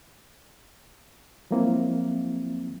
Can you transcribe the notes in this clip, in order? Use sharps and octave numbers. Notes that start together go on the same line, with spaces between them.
F3 F#3 G#3 A#3 C4 E4